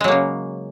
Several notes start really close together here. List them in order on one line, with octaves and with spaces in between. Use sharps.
G#3 F#3 A#3 C#3